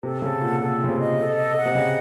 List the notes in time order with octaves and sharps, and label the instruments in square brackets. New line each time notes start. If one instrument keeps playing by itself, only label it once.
[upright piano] C3 [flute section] A4
[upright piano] C#3 [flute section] A4
[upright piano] A#2 [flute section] F#5
[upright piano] A#2 [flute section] A4
[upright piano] C#3 [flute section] F4
[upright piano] C3
[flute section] D#5
A4
D#5
F#5
[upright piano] C3
[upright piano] C#3 [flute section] D#5